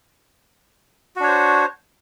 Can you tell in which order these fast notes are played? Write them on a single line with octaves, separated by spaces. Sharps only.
F#4 D4 C#5 C5